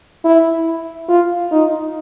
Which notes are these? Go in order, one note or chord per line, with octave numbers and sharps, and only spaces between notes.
E4
F4
D#4